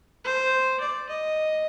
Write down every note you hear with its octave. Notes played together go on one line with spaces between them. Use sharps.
C5
D5
D#5